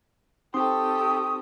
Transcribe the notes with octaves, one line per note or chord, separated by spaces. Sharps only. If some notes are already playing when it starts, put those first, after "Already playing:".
C4 D#4 G4 A4 C6 C#6 D#6